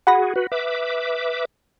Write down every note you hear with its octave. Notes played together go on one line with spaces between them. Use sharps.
F#4 G#4 F#5 B5 A#6
F#4 B4
B4 E5 D6